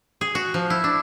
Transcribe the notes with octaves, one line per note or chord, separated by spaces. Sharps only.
G#4
F#4
F3
E4
D4